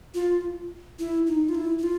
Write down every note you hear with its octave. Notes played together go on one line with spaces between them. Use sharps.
F4
E4
D#4
F4
E4
E4
F4